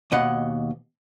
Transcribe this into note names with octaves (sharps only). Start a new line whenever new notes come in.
D#2 B2 D#5 F#5